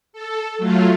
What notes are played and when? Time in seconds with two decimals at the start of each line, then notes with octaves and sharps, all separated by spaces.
0.13 A4
0.58 F#3 A3 F4